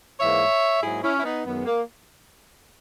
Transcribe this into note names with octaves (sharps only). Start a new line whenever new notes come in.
G#2 E3 A#3 C#5 E5
G#2 F#3 A#3 E4 G#4
C#4 E4
E4
B3 D#4
F#2 D#3 G#3 B3
A#3